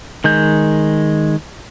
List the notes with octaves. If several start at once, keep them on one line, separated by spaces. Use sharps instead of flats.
D#3 G#3 G6